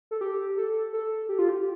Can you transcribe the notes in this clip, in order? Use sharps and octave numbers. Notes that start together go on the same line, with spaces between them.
A4
G4
A4
A4
G4
F4
G4